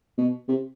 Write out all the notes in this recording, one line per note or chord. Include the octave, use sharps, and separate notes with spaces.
B2
C3